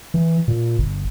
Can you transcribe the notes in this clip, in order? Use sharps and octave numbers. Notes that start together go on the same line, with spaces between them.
E3
A#2
G1